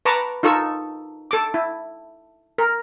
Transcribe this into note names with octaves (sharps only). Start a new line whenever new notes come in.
B4 A5 A#5 C#6 D6
D#4 F4 A4 C#6 E6
A4 D6
E4
A#4